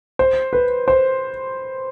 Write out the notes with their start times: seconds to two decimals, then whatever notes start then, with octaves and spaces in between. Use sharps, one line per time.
0.19 C5
0.53 B4
0.88 C5